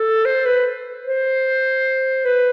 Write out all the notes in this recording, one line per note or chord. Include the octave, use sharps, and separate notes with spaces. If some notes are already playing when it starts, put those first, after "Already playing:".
Already playing: A4
C5
B4
C5
B4